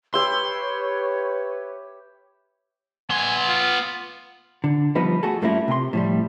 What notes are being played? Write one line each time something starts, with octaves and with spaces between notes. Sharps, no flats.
G4 B4 C#5 E5 C6
B3 G#5 C6
F4
D3
F3 G3 B3 D#4 B4
A3 F#4 G#4 A4
G2 A3 A#3 C#4 E4 F4
C3 C6
A2 F3 G3